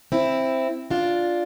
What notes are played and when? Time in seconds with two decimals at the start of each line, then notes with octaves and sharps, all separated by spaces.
0.12 C4 E4
0.90 D4 F4